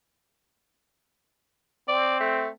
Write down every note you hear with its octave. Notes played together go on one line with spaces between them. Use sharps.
C4 D5
A3